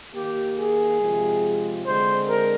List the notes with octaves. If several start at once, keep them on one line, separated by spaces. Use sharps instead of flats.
D#3 A#3 G4
G#4
C3 F3 G#3
D3 G#3 C4 C5
A#4